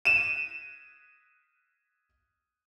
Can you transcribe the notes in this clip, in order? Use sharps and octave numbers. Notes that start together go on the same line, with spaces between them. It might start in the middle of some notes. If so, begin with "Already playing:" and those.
D#7 E7